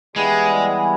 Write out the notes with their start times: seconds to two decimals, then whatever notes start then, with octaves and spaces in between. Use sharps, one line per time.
0.15 E3 G3 G#3 B3 E4 G#4